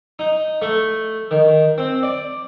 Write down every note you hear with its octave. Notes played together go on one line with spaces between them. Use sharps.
D#4
A3
D#3
C4
D5